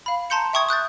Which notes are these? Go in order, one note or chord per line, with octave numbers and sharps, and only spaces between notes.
F5 B5
A5 A#5 C6 G6 C#7
E5 G5 C#6 D#6 G#6
D#6 F#6 G6 A6